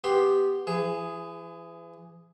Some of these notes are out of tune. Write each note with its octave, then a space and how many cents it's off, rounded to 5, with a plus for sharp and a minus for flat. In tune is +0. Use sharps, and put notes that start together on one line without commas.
B3 +0 G4 +0 C6 +0
E3 +40 G#4 +0